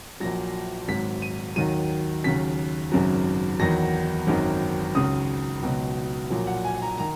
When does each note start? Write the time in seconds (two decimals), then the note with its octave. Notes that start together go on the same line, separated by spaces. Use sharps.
0.20 A#1 A#2 F#3 A#6
0.88 G#1 G#2 F#3 B6
1.22 D#7
1.56 D#2 D#3 F#3 D#7
2.24 D#2 C#3 F#3 B6
2.92 G#1 F#2 C#3 F#3
3.60 E2 D#3 F#3 A#6
4.27 G#1 F#2 D#3 F#3
4.95 C#2 C#3 F#3 D#6
5.63 C#2 B2 F#3
6.30 A#1 A#2 F#3
6.47 F#5
6.65 G#5
6.82 A#5
6.98 D#3 A#5